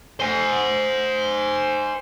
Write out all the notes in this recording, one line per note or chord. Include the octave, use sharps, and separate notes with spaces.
C5 G#5